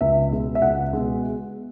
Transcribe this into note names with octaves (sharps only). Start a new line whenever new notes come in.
C#2 E5
B2 G#3
E5
C#2 F#5
B2 G#3